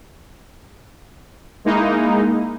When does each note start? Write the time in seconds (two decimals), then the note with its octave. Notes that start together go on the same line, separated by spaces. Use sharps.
1.65 G#3 A#3 D#4 E4